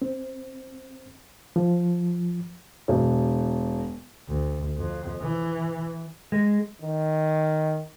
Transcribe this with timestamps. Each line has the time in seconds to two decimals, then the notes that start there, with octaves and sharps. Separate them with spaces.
0.02 C4
1.56 F3
2.88 E1
4.28 D2
4.77 F2
5.21 E3
6.32 G#3
6.82 D#3